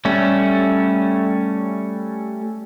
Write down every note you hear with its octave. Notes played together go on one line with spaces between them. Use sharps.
G3 A3 C#4